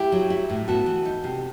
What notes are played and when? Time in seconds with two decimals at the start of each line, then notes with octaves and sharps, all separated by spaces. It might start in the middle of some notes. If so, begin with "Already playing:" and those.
Already playing: E4 G4
0.12 F#3
0.30 E4
0.50 A2
0.68 B3 F#4 A4
0.86 E3
1.05 D#4
1.24 C3